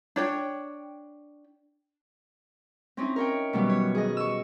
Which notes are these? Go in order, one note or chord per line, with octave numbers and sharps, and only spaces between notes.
D4 C#5 G5
C4 C#4 D#4 E4
A#4 C#5 G5
B2 D#3 F#3 G3 B3
C#5
G#4 D#5
C#6 E6